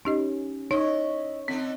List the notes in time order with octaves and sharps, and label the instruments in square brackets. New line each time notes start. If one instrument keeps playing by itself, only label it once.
[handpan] C#4 [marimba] D#4 G4 D#5
[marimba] D#4 [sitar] E4 D#5 [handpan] C#5
[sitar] D3 A3 D#4 [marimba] C4